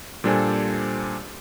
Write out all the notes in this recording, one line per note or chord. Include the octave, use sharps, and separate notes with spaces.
A#2 G3 D4 A4 C5 G#5